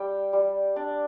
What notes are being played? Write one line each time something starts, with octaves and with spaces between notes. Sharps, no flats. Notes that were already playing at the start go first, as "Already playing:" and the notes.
Already playing: G3 G5
G3
D4 D5